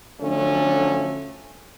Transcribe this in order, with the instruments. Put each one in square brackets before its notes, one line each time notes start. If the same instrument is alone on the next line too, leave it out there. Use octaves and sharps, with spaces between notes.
[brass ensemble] D3 F3 F#3 A3 C#4